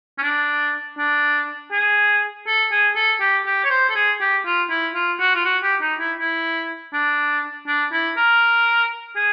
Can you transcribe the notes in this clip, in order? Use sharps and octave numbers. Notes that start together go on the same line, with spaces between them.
C#4
D4
D4
G#4
A4
G#4
A4
G4
G4
C#5
C5
A4
G#4
G4
F4
E4
F4
F#4
F4
F#4
G4
D#4
E4
E4
D4
D4
E4
A#4
G#4